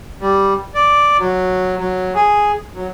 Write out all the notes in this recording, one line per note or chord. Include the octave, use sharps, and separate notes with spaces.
G3
D5
F#3
F#3
G#4
F#3